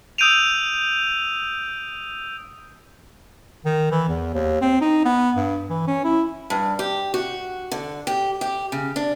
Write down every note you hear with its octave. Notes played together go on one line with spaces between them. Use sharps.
D#6 E6 G6 D7 D#7 F7
D#3
E3
E2
D#2
C4
D#4
B3
G2
E3
C#4
E4
G2
G4
F#4
D3
G4
G4
C#3
D4